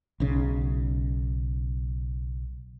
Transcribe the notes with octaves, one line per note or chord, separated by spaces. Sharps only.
B1 C#3